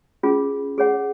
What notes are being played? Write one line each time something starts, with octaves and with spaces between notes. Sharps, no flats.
C#4 F4 G#4
G#4 C#5 F#5